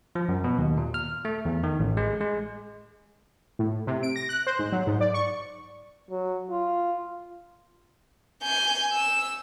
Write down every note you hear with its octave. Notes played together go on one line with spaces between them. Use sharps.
F3
F#2
B2
D#2
A#2
F6
A3
E2
D#3
A1
G#3
G#3
A2
C3
D7
A#6
F#6
C5
G#2
F#3
G#2
D5
C#6
F#3
F4
G#5 G6
E6